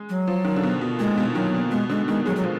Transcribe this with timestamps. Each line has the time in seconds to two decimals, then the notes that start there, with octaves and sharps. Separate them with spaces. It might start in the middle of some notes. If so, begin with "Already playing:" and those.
Already playing: G#3
0.09 F#3
0.28 F3
0.45 D#3
0.56 D3
0.63 B2
0.81 B2
0.99 A#2 G#3
1.18 B2
1.35 D#3 F#3
1.54 B2
1.71 B2 G#3
1.90 D3 G#3
2.08 D#3 G#3
2.26 F#3 G#3
2.36 F#3
2.44 F3